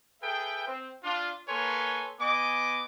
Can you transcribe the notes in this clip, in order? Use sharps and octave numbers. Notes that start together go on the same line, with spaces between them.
G#4 A4 B4 E5 G5
C4
D4 F4
A#3 A4 B4 C#5 G#5 C6
B3 D#5 G#5 D6